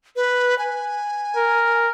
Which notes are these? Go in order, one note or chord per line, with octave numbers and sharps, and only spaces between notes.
B4
G#5
A#4